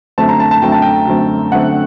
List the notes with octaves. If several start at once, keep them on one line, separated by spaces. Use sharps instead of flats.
F#2 D3 A3 C4 A5
A#5
A5
A5
F#2 D3 A3 C4 G5
A5
G5
F#2 D3 A3 C4
F#2 D3 A3 C4 F#5